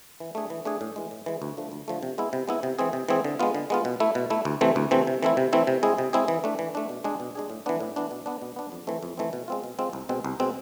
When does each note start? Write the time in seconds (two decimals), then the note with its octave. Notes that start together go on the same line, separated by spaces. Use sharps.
0.20 E3
0.35 A3 D4 G#4
0.50 E3
0.65 A3 D4 G#4
0.81 A2
0.96 E3 G#3
1.11 A2
1.26 E3 G#3
1.42 D2
1.57 D3 F3 A3
1.72 D2
1.88 D3 F3 A3
2.03 C3
2.18 G#3 B3 E4
2.33 C3
2.48 G#3 B3 E4
2.63 C3
2.79 E3 G#3 C4 G#4
2.93 C3
3.09 E3 G#3 C4 G#4
3.24 D3
3.39 G#3 B3 F4
3.54 D3
3.70 G#3 B3 F4
3.85 B2
4.00 A3 E4
4.15 B2
4.30 A3 E4
4.45 D2
4.61 C3 E3 A3 C4
4.76 D2
4.91 C3 E3 A3 C4
5.07 C3
5.23 E3 A3 C4 E4
5.37 C3
5.53 E3 A3 C4 E4
5.67 C3
5.83 G#3 C4 E4 G#4
5.98 C3
6.13 G#3 C4 E4 G#4
6.28 E3
6.44 A3 D4
6.59 E3
6.75 A3 D4
6.89 B2
7.04 G#3 D4 G#4
7.20 B2
7.35 G#3 D4 G#4
7.50 A2
7.66 E3 B3 D4
7.80 A2
7.96 E3 B3 D4
8.11 B2
8.26 B3 D4
8.42 B2
8.56 B3 D4
8.72 F2
8.87 E3 A3 C4
9.03 F2
9.17 E3 A3 C4
9.33 B2
9.48 G#3 C4 F4
9.64 B2
9.79 G#3 C4 F4
9.93 C2
10.09 B2 G#3 C4
10.24 C2
10.40 B2 G#3 C4